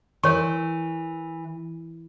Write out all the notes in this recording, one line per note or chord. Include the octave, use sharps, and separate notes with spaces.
E3 A#4 C#5 C#6